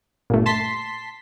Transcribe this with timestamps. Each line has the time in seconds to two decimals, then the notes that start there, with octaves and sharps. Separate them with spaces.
0.30 G1 A#2 A3
0.46 A5 C6 B6